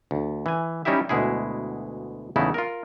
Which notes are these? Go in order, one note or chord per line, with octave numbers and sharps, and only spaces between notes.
D2
E3 G#5
G3 C#4 D#4 E4 G4 E5
D2 B2 G#3 E4 G#4
E2 C#3 A3 B3 D#4 E4
F4 A#4